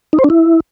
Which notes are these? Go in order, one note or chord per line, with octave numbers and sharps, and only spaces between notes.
D#4
C5
D4
E4